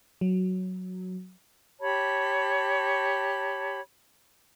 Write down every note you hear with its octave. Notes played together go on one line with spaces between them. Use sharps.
F#3
G4 C#5 A5 B5